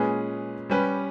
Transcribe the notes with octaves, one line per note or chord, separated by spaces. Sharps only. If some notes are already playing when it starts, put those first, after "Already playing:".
Already playing: A#2 G#3 C#4 G#4 B4
G3 C#4 G4 B4